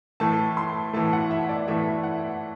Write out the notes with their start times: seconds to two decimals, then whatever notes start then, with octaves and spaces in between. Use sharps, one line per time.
0.20 A2 E3 A3 A5
0.57 C6
0.93 A2 E3 A3 A5
1.13 F#5
1.31 E5
1.49 D5
1.67 A2 E3 A3 E5
2.03 F#5